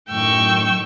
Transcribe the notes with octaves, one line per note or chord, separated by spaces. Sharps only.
F#2 A2 D#3 G5 C#6 E6